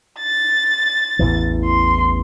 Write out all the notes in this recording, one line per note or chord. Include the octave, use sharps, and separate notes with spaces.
A6
A1 E2 E3
C6